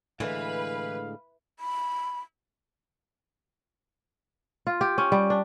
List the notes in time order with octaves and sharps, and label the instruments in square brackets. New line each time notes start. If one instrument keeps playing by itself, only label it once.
[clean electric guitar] A2 D3 G#3 [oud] E3 [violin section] B4 [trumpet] F5
[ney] B5
[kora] F4
G4
C#4
G3
D4